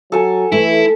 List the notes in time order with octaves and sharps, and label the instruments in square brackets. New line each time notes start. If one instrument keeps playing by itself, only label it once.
[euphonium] F#3 [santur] A4 G#5
[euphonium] E3 [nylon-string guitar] A3 [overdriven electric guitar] E4